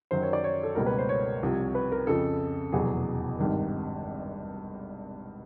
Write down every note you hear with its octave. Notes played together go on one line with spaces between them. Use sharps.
F#2 D#3 F#3 C5
C#5
D5
C#5
A4
C#2 B2 G3 A#3 A#4
B4
C5
C#5
C2 C3 F3
B4
A#4
F2 C#3 F3 A4
F1 E2 B2 F#3 G#4
G#1 G2 D#3